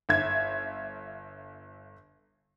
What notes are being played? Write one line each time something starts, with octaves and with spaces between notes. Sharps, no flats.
G1 E5 G#6